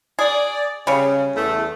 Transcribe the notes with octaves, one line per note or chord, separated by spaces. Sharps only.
G#4 D5
C#3 G3 C#4
E2 A3